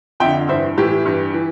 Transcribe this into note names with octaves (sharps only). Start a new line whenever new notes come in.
F2 D3 E5 G5
G2 E3 C5 E5
A2 E3 E4 G4
G2 E3
E3